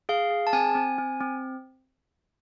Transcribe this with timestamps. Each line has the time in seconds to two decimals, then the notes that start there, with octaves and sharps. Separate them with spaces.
0.09 G#4 F5
0.31 G#4
0.47 A5
0.53 C4 G#5
0.75 C4
0.98 C4
1.21 C4